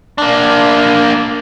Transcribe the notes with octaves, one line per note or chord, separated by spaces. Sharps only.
A#3 D4